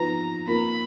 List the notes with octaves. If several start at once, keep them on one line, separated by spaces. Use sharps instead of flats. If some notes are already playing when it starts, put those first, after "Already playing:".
Already playing: F3 B3 F4 B4 A#5
A#3 F4 A#4 B5